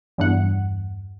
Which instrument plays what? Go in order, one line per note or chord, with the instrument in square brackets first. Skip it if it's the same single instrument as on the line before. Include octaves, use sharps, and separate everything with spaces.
[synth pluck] E2 G2 F#5